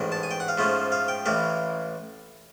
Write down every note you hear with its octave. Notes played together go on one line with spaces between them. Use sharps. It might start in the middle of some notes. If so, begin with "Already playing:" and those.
Already playing: A1 G#2 D#3
A5
G#5
G5
F#5
F5
G#2 F3 A3 C#4
F5
G5
A1 A2 E3 F5